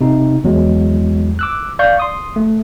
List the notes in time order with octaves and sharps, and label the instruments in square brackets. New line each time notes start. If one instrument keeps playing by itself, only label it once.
[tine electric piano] C3 D#4
E2 F#3 G#3
D6 E6 F#6
D5 F5 C#6 G6
C6 D#6
A3